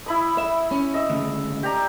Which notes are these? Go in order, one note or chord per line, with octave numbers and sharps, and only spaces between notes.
E4 B5 D#6
E5
C#4
D#5 E5
D2 C#3
G4 D5 A#5